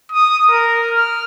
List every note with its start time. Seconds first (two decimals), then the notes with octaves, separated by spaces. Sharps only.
0.12 D#6
0.50 A#4
0.91 F6